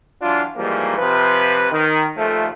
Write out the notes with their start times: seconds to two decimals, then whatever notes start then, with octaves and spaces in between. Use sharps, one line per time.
0.22 E3 F#3 D4 F4
0.57 G#2 E3 F3 G3 G#3 A#3
0.98 C3 F3 B4
1.72 D#3
2.18 D#2 A#2 F3 A3